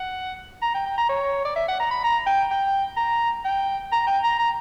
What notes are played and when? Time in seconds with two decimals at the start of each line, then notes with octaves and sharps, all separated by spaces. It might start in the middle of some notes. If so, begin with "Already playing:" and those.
Already playing: F#5
0.62 A#5
0.75 G5
0.86 G5
0.98 A#5
1.09 C#5
1.45 D5
1.56 E5
1.68 F#5
1.79 A#5
1.91 B5
2.04 A#5
2.27 G5
2.51 G5
2.97 A#5
3.45 G5
3.92 A#5
4.07 G5
4.23 A#5
4.39 A#5